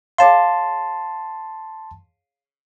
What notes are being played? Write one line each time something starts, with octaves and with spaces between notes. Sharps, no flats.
G#4 C#5 F5 A5 C6